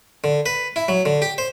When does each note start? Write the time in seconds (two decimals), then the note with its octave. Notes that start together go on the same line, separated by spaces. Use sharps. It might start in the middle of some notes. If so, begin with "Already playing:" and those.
0.24 D3
0.46 B4
0.76 E4
0.88 F#3
1.05 D3
1.22 G4
1.38 C5